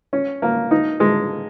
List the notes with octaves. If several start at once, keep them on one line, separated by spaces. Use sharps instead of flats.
C#4
A#3
D#4
G#3